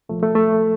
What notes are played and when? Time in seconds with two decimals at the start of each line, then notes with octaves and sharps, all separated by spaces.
0.09 C2 A#2 F3 A3
0.23 A3
0.36 A3